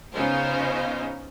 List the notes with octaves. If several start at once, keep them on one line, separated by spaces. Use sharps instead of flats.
C#3 B3 C#4 D#4 F4 C5